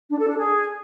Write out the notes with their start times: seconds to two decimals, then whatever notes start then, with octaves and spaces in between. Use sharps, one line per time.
0.09 D4
0.19 A4
0.28 D4
0.38 G#4